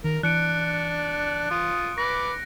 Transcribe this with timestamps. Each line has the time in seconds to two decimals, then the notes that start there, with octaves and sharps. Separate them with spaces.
0.04 D#3 A#4
0.23 E3 D4 F#6 C#7 D7
1.51 F4 D#6
1.98 B4 D6 A#6